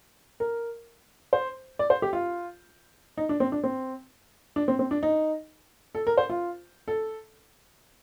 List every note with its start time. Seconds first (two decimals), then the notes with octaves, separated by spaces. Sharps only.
0.40 A#4
1.33 C5
1.79 D5
1.90 C5
2.02 G4
2.13 F4
3.17 D#4
3.29 D4
3.40 C4
3.52 D4
3.64 C4
4.56 D4
4.68 C4
4.79 C4
4.91 D4
5.03 D#4
5.95 A4
6.07 A#4
6.17 C5
6.30 F4
6.88 A4